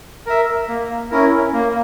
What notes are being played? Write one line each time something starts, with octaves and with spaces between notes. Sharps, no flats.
A#4 E5
A#3
C#4 E4 A#4
A#3